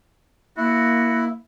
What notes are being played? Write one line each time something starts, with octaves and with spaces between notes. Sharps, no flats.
A#3 E4 F#4